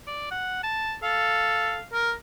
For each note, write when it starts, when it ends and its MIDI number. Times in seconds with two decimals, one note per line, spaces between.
0.07 0.30 74
0.31 0.63 78
0.63 0.96 81
1.03 1.77 69
1.03 1.85 77
1.93 2.12 70